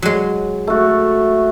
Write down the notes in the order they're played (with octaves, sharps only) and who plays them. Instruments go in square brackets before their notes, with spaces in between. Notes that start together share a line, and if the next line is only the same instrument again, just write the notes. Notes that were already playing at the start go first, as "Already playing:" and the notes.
[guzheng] F#3 G#3
[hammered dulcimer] A3 F#4